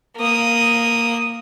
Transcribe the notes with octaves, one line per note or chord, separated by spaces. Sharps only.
A#3 D#6